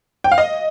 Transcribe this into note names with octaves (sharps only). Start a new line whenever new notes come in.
G5
F5
D#5